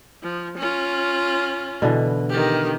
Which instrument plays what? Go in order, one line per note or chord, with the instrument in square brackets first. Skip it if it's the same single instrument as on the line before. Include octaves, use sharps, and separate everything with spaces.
[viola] F3
C#4 F4
[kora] B2 D3 E3
[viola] D#3 G4